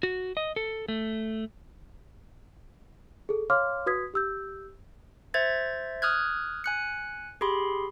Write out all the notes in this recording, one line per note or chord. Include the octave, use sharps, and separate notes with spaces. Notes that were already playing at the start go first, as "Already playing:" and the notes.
F#4
D#5
A4
A3
G#4 A4
C#5 F5 C6 D6 F6
F#4 B4 D#6 G#6 B6
G4 E6 G6
C5 E5 G#6 A6
D#6 F6 F#6 G#6
G#5 F#6 C#7
G4 G#4 B5 C6